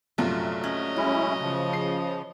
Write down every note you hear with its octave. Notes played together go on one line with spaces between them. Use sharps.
A#1 F#2 C3 A3 F4 F#4
C#4 C#5 D#5
G#3 C#4 E4 F#4
C#3 F3
C7